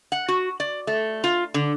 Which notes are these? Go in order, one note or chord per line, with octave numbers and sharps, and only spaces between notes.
F#5
F#4
D5
A3
F4
D3